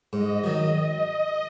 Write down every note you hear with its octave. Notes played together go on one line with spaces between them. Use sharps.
G#2 D#5
D#3 F#3